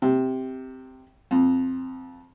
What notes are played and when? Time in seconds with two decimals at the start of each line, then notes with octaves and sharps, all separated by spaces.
0.02 C3
1.31 F2